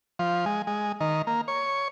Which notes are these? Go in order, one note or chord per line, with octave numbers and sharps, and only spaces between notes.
F3
G#3
G#3
D#3
A#3
C#5